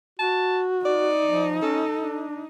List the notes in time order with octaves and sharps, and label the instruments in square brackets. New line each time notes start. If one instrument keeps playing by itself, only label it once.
[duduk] F#4 [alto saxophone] A5
[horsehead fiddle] D#4 [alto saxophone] D5
[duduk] F3
[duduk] C#4 [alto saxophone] A4
[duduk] D4